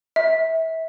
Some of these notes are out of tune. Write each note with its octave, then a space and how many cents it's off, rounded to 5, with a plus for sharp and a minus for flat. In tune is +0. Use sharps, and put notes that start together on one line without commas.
E5 -30